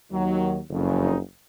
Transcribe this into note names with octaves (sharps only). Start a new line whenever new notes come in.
D#2 D#3 F#3
F#1 F2 C#3
D#4